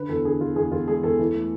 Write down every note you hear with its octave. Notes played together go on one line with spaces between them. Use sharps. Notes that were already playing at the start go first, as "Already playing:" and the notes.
Already playing: D3 B4
E2 A4
D3 G#4
E2 F4
E2 G#4
E2 F4
G#3 G#4
E2 A4
E3
A3